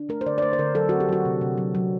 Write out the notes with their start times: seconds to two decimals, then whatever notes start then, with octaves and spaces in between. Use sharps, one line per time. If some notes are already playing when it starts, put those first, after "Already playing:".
Already playing: D4
0.09 A3 A#4
0.21 C5
0.26 D3 D5
0.38 D5
0.42 A3 C5
0.53 C5
0.59 D3 A#4
0.75 F#3 A4
0.89 C4 F#4
1.00 G4
1.09 F#3 F#4
1.25 C3
1.41 C3
1.58 F#3
1.75 F#3